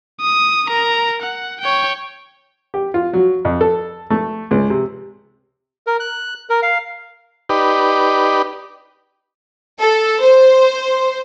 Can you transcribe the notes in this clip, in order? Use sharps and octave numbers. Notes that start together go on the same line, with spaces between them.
D#6
A#4 A#5
F#5
C#5 G5
G4
F4
F#3
F2
A4
A3
C#2
C3
A#4
F#6
A#4
F5
D#4 G4 B4 D5
A4
C5